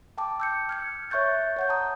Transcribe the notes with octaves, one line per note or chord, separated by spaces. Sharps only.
G5 A5 D6
E6 G6 C#7
F6 G#6 C#7
C#5 E5 C#6 F#6 G6 A6
C#5 F#5 G6
A5 A#5 D#6